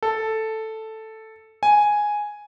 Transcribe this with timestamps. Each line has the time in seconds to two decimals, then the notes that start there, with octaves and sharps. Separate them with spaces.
0.03 A4
1.63 G#5